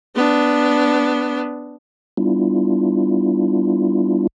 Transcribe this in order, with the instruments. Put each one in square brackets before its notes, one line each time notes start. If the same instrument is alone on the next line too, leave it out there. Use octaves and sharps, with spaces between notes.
[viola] B3 D4
[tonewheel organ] G3 B3 D4 E4 F4